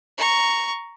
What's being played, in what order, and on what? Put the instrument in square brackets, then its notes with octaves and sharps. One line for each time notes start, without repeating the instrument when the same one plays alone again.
[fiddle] A#5 C#6